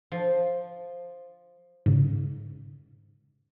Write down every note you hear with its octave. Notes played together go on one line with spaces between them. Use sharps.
F3
G#2 C#3